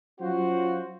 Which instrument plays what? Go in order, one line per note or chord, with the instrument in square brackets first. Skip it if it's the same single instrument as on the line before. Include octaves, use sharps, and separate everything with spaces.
[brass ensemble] F#3 C#4 F4 F#4 C5